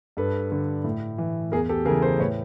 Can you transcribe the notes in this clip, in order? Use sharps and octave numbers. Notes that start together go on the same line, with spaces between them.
G2 A4 B4
D3
A2
E3
E2 G#4 A#4
G4 A4
C#3 E3 G#4 A#4
A#4 C5
A2 B4 C#5